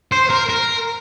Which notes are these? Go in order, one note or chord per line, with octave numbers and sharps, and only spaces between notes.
C5
A#4
A#4